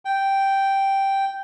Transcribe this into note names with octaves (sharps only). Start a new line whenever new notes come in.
G5